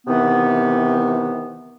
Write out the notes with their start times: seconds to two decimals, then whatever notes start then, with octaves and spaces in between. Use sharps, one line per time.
0.07 C3 D#3 E3 B3